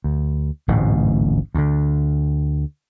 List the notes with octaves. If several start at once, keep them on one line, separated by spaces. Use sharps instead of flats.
D2
D1 A1 G#2 B2
D2 D3